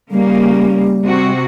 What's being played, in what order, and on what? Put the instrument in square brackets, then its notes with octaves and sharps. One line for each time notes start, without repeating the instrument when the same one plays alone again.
[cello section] C#3 A#3 [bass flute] G3
[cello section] C3 F#4